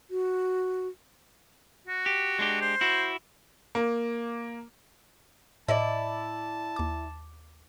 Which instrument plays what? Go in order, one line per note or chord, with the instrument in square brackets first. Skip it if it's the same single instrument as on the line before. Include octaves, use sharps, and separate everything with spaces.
[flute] F#4
[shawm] F#4
[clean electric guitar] G4
G#3 D4 G4
[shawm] C5
[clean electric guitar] E4 F#4
[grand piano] A#3
[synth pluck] A2 D#5 [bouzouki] E4 D5 [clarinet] A5
[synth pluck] D#2 D6